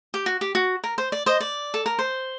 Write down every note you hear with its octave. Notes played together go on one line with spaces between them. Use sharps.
G4
F#4
G4
F#4
A#4
C5
D5
C5 D#5
D5
A4
A#4
C5